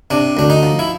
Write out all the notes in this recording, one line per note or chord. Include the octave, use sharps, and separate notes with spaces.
C3 D4
D2 D4
D#4
F3
E4